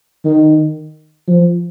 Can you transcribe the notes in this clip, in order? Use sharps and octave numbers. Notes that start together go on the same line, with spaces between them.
D#3
F3